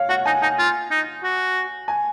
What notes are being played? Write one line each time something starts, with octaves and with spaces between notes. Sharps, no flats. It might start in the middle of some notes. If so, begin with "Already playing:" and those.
Already playing: C#5 F5
F#4 F#5
D#4 G#5
D#4 G#5
F4
D#4
F#4
G#5